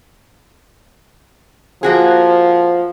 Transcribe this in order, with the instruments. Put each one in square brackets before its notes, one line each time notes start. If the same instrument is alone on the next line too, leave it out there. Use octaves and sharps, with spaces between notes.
[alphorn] F3 [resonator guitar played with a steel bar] A#3 F#4 G#4